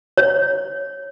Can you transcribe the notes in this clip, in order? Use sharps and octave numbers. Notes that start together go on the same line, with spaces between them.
C#5